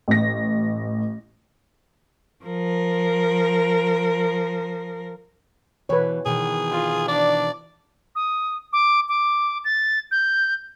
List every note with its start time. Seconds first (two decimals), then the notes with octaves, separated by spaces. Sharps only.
0.08 A1 A#6
2.44 F3 A#4
5.89 B2 E3 B4 C#5
6.26 B2 D#3 E3 G#4
6.72 F4
7.08 D4 D5
8.15 D#6
8.73 D6
9.09 D6
9.65 A6
10.11 G6